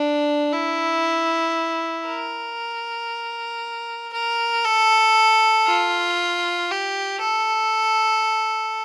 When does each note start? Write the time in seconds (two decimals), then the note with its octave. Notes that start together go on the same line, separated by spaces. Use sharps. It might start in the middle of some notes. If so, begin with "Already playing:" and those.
Already playing: D4
0.53 E4
2.07 A#4
4.13 A#4
4.65 A4
5.67 F4
6.71 G4
7.22 A4